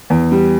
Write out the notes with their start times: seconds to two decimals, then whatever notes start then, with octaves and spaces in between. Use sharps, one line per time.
0.10 E2
0.32 G3